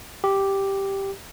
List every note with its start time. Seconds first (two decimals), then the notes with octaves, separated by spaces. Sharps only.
0.24 G4